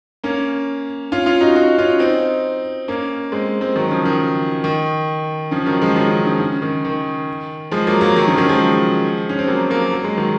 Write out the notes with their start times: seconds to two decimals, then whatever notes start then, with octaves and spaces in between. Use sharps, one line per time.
0.24 A#3 C#4
1.12 C#4 F4
1.26 C#4 F4
1.41 D#4 F#4
1.56 D#4 F#4
1.78 C#4 F4
1.99 C4 D#4
2.88 A#3 C#4
3.32 G#3 C4
3.61 G#3 C4
3.76 D#3 F#3
3.91 C#3 F3
4.06 D#3
4.64 D#3
5.51 C#3 F3
5.67 D#3 F#3
5.82 F3 G#3
5.96 D#3 F#3
6.10 C#3
6.25 C#3 F3
6.40 C#3
6.62 D#3
6.85 D#3
7.71 F3 G#3
7.87 F#3 A#3
8.01 F#3 A#3
8.16 D#3 F#3
8.27 C#3 F3
8.38 D#3 F#3
8.49 F3 G#3
9.29 C#4
9.39 C4
9.48 F#3 A#3
9.70 F#3 A#3
9.92 F#3
10.04 G#3
10.18 D#3 F#3